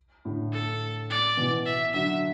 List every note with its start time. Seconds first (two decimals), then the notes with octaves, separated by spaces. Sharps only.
0.25 A2 D3
0.53 A4
1.10 D5
1.37 B2 E3
1.66 E5
1.94 D3 F#3 E5